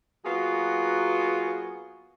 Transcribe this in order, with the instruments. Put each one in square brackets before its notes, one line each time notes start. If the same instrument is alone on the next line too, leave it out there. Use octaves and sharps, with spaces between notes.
[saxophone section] F#3 A#3 B3 F4 F#4 G#4